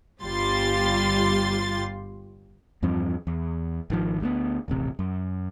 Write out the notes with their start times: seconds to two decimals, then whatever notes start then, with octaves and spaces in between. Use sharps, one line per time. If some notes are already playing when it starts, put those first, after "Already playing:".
0.22 G1 G3 F4 C6 A6
2.82 E2 G2 F3 C4
3.27 E2
3.90 G#1 D#3 F3
4.21 D2 G3 B3
4.68 D#1 A1 C3
4.99 F#2